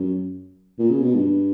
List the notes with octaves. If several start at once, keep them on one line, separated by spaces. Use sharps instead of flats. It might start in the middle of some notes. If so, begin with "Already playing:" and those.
Already playing: F#2
A#2
C#3
B2
G2